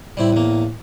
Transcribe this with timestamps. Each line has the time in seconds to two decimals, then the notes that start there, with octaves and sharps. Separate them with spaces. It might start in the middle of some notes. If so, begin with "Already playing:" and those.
0.17 A2 G3 C4 E4
0.33 E2 A#3